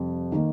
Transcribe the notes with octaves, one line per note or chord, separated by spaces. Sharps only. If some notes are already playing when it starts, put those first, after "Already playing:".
Already playing: F2 C3 G3
D#3 A#3